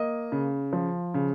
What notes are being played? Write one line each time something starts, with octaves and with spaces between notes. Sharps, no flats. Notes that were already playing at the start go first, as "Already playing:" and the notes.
Already playing: A#3 D#5
C#3
F3
C#3